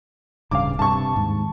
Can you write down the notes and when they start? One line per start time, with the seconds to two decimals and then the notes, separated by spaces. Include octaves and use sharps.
0.51 D1 G2 C#3 F5 D6
0.79 G2 C3 A5 C#6
1.16 D#2 G#2